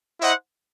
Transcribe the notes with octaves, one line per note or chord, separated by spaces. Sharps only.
E4 C5 D#5 F#5